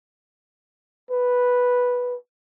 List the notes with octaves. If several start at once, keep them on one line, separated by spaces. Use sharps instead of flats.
B4